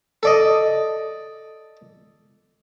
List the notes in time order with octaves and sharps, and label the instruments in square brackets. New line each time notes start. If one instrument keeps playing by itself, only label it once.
[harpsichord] A4 D5 D#5